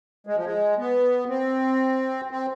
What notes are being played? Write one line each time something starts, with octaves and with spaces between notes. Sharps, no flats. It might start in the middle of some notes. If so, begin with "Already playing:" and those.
G#3
F3
G#3
B3
C4
C4